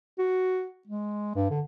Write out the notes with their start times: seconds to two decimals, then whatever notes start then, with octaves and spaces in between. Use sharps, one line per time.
0.19 F#4
0.87 G#3
1.36 G2
1.50 D3